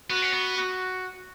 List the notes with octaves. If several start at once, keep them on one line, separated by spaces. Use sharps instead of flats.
B3 F#4
C#4
B3
F#4